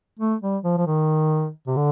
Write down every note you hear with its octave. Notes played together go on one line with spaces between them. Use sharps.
A3
G3
F3
F3
D#3
C3
D3